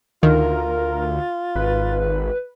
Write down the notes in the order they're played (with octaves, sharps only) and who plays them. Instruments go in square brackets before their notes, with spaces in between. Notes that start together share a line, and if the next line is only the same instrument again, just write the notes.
[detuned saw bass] D2 [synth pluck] D#3 [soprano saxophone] F4 [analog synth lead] A#4
[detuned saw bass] G#1 [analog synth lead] B4